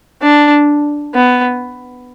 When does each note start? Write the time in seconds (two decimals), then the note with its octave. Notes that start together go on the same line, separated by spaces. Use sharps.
0.22 D4
1.15 B3